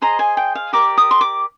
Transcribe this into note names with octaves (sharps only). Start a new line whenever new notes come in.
G#4 C5 D#5 A#5
G#5
G5
F5
G4 A#4 D5 D6
D#6
C6
D6